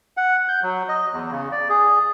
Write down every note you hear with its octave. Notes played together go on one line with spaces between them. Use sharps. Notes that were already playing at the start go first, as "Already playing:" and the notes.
F#5
G6
F#3
D#5
E2
C#3
D5
G#4